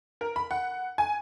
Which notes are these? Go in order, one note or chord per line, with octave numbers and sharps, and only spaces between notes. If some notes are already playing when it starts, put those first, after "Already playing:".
A#4
B5
F#5
G#5